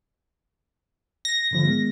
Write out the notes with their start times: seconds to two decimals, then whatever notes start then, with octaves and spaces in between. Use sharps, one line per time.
1.25 A#6
1.51 G#2 D3 F3
1.63 D#3 G#3 B3